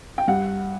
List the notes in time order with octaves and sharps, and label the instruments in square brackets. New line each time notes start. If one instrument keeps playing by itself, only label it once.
[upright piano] G5
G2 F#5